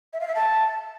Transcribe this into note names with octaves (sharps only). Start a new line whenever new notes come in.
E5
F5
E5
A5